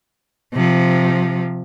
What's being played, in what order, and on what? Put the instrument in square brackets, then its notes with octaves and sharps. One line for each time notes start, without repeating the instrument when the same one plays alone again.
[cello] C3 F3